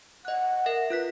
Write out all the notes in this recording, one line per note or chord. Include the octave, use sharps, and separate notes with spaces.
D#5 F#5 F#6
A#4 E5 A#6
F4 B4 F#6 B6